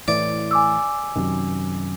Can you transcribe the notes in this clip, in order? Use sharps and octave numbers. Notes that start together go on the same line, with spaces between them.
A2 E3 D5
G#5 D6 E6
F#2 C3 D#3